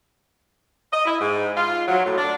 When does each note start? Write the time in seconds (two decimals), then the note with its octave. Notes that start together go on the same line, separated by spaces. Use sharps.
0.92 D#5
1.06 E4
1.19 G#2
1.56 F4
1.87 F#3
2.03 A2
2.17 D4